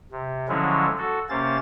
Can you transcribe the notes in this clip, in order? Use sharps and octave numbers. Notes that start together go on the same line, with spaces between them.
C3
D3 F3 F#3 G#3 C#4 E4
F#4 A4
C3 A#3 C#4 C5 A6